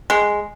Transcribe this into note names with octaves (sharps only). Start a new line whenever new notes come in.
G#3